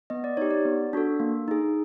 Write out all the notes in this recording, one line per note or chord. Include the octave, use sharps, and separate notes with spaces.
B3 D#5
D5
D#4 G4 C#5
D5
B3
D4 F#4 A4
A#3
D#4 G#4